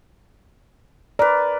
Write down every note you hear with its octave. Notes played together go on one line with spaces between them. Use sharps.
A#4 B4 D5